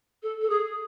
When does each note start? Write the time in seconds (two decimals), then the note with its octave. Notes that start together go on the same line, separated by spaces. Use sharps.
0.23 A4
0.41 A4
0.50 G#4